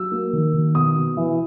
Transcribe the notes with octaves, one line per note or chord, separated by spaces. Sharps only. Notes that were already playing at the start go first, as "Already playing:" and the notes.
Already playing: F#3 E6
A#3
D#3
D#3
B2 D#6
B2
E3